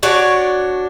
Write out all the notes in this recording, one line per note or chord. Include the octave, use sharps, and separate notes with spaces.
D4 F#4 C#5 D5